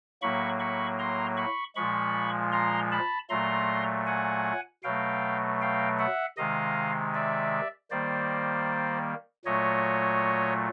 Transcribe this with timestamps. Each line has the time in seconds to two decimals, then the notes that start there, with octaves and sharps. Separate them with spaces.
0.22 A2 F#3 A#3 B5 C#6
0.60 B5 C#6
0.99 A#5 C6
1.37 B5 C#6
1.75 A#2 F3 G#3 B5 C#6
2.52 A#5 C6
2.92 A5 B5
3.29 A#2 F#3 A3 A#5 C6
4.06 F#5 G#5
4.83 B2 F#3 A3 F5 G5
5.61 F5 G5
5.98 E5 F#5
6.37 C3 D#3 G#3 D#5 F5
7.14 D5 E5
7.91 D#3 G3 A#3 C5 D5
9.45 A#2 F#3 A3 C#5 D#5